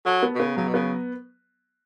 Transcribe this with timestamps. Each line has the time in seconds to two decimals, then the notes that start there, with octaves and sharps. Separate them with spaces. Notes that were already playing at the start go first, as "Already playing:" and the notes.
0.05 F#3 A4
0.23 B3
0.35 B2
0.40 C#3 B3
0.57 C#3 F#3
0.67 B2
0.74 C#3 B3